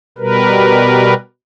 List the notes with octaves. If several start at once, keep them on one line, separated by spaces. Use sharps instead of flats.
B2 G3 A#4 B4